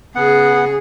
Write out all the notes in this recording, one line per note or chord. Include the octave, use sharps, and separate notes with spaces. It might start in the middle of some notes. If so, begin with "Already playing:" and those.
C#3 B3 G#4 F#5